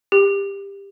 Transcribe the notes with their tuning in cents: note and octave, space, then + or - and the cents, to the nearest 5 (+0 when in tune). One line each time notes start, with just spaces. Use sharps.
G4 +20